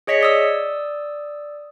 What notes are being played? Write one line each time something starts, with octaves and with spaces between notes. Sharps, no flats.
G#4 C#5 D#5 B6 C#7
D5 D#6 E6